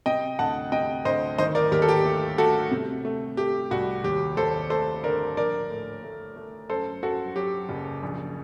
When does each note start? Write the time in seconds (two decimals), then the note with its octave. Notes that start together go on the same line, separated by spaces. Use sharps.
0.06 C3 D#5 G5
0.39 D2 F#5 A5
0.72 C3 D#5 G5
1.05 D2 C5 D#5
1.38 D#3 C5 D#5
1.55 A#4 D5
1.72 D#2 G4 A#4
1.82 A4
1.89 G4
2.05 A3
2.38 A3 F#4 A4
2.71 C3
3.05 A3
3.37 A3 G4
3.71 C2 F#4
4.04 D#2 G4
4.37 D#2 A4 C5
4.70 A3 A4 C5
5.04 D3 A#4 D5
5.37 A#1 A#4 D5
5.70 A2
6.03 A3
6.36 A3
6.69 F#2 A4 C5
7.03 F#2 F#4 A4
7.36 F#3 G4
7.69 F#1
8.03 A#1